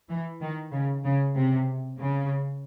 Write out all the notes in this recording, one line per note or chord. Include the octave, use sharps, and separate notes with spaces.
E3
D#3
C#3
C#3
C3
C#3